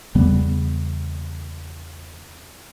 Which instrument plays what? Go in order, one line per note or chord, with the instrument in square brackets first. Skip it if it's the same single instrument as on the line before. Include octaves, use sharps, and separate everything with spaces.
[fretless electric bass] E2 C#3 G3 B3